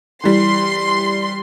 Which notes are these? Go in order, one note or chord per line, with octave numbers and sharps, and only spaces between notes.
E3 G3 C6